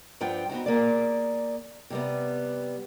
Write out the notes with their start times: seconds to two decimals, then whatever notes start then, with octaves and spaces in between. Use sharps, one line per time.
0.21 G2 F3 F4 F#5 G5
0.49 B3 C4 D#4 F#4
0.66 A#3 G#4 D5
1.90 C3 G3 B3